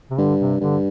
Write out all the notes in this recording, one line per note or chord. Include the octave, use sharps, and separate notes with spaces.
C3
G2 D3
C3
G2 D3